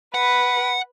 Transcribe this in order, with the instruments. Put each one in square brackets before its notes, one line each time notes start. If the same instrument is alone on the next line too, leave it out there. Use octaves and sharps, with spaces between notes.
[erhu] B4 [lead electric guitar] F#5